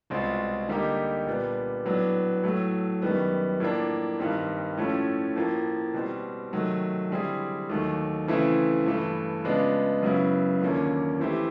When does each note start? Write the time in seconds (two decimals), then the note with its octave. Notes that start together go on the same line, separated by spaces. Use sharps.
0.10 C2 B2 G#3 C4 F4
0.69 D3 G3 A#3 D#4 G4
1.27 A#2 G3 B3 D4
1.85 A2 F#3 B3 D4
2.44 A2 F#3 A3
3.02 F#2 D#3 G3 B3
3.60 A2 F3 A#3 D4
4.19 G2 D#3 G3 C4
4.78 A2 F3 A3 C#4
5.36 A2 F3 A#3
5.94 B2 G3 C4
6.53 C3 D#3 F#3 A3
7.11 D3 G3 C4 E4 G#4
7.70 D#2 D#3 F#3 A3
8.28 C#3 E3 A3 C4 E4
8.86 G2 E3 A3
9.44 C#3 F3 G#3 B3 D4
10.03 F#2 C#3 F#3 B3 E4
10.61 D#2 D3 F3 A#3 C#4
11.19 E3 A3 C4 E4 G4